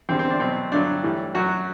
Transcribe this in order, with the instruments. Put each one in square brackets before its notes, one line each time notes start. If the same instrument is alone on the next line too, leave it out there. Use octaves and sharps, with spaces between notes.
[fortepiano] E2 D3 G3 C4
C4
D4
B2 F#3 C4
G2 D3 F#3 D4
A2 E3 G3
F#2 F#3 F#4